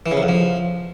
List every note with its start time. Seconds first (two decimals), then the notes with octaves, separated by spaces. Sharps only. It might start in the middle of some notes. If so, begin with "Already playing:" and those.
0.06 E3
0.11 C#3
0.17 C3
0.23 F2
0.29 F3